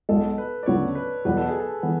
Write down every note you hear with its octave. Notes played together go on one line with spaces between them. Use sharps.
B1 B2 G#3 A4
B4
D5
D2 C#3 F#3 B3 C#5
B4
E2 B2 F#3 B4
A4
G#4
A4
E3 B3